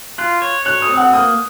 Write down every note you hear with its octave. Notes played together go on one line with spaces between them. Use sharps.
F4 F#6
C#5
C#5 F#6
D#6
C4
F#5
A#3 D#6